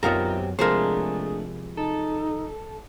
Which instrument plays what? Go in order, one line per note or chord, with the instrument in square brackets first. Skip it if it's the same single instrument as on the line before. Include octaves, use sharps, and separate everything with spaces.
[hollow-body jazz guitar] F#2 B2 F#3 [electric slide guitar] C4 G4 [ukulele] D#4 F4 A#4
[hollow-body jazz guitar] C3 F3 G#3 [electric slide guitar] A3 D4 [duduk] G#4 [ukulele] A#4 C5
[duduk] D#4 [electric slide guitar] A4